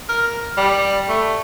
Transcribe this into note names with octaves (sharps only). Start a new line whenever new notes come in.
A#4
G3
A3